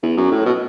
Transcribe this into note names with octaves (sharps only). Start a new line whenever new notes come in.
E2
F#2
A2
B2